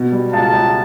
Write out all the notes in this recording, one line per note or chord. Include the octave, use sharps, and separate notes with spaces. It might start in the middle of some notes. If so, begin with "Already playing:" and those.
Already playing: B2
G3
C#2 A5
C#2